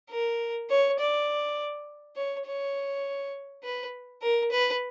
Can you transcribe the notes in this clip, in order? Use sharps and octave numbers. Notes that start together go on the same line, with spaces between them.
A#4
C#5
D5
C#5
C#5
B4
A#4
B4